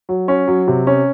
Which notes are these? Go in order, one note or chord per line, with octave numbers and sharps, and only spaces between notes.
F#3
C#4
F#3
C3
C#4